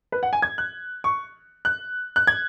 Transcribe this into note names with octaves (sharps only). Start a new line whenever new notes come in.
B4
F#5
G#5
G#6
F#6
C#6
F#6
F#6
G#6